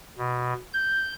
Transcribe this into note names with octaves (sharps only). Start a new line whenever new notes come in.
B2
G6